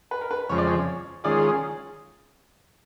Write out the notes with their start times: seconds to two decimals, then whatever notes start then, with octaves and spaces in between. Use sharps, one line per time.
0.11 B4
0.21 A#4
0.31 B4
0.49 F2 C#3 F3 G#3 C#5
0.58 D5
0.67 C#5
1.24 D#3 G#3 C#4 F4 G#4 D5